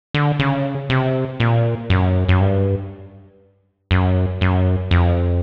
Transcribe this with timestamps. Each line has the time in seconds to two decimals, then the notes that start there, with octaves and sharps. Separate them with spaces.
0.14 D3
0.39 C#3
0.90 C3
1.40 A#2
1.90 F#2
2.29 F#2
2.41 G2
3.91 F#2
4.41 F#2
4.91 F2